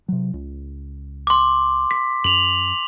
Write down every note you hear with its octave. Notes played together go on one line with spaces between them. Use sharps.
C3 F#3
C#2
C6 D6
B6
F#2 F7 F#7